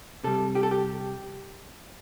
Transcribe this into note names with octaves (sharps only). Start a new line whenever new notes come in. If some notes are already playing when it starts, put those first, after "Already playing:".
C3 G3 A4
G4
A4
G4